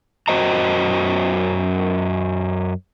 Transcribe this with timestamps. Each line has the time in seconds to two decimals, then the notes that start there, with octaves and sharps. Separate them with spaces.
0.28 F#2 F#4 C5 D#5 A#5